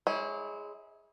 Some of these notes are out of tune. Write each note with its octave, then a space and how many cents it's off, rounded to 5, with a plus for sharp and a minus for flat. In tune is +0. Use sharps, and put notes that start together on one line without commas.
G#3 +0 E4 -30 C#5 +0